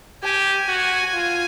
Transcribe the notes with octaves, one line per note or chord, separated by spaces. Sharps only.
G4 G#5
F#4
F4